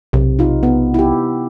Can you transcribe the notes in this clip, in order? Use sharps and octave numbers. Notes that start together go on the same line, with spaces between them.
B1 C3
D#4 F4
B3
E4 G4